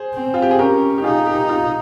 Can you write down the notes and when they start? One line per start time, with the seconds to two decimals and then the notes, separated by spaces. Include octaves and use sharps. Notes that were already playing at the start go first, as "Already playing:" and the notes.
Already playing: G#4 C5
0.14 C4
0.34 F4
0.42 G4
0.51 G#4
0.59 C#4 G4 A#4
0.98 G4
1.04 D#4 F4 G#4
1.26 G4
1.49 F4